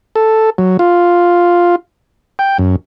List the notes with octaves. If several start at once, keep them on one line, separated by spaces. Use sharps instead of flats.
A4
F#3
F4
G5
F#2